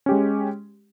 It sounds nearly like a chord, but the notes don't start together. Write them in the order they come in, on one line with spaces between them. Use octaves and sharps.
C#4 G4 G#3